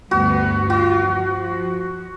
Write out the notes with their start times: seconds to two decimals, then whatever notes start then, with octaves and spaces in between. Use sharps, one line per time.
0.11 D2 G2 B3 F#4
0.70 F4 F#4
1.08 F3